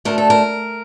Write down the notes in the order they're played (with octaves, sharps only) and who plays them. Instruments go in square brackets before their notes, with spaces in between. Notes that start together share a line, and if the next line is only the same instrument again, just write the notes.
[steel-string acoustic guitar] D2 D3 A3 A#4
A4
A#4